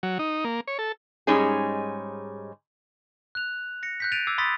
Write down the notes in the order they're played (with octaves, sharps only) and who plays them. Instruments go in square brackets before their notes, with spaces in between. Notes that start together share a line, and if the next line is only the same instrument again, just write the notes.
[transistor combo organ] F#3
D#4
A#3
C#5
A4
[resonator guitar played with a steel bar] G#2 G3 G#3 C#4 D#4 G#4
[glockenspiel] F#6 F7
A#6 C#7
F#6 G6 B6
A6 B6 D7 D#7 F7
D6 E6 G#6 C7
B5 C6 D#6 A6 B6